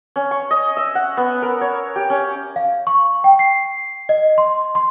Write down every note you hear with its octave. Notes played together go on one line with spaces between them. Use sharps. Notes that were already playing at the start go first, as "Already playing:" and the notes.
C#4
C#6
D#5
E5
F#5
B3
A#4
C#5
G4
C#4
F5
C#6
G5
C7
D#5
C6
C6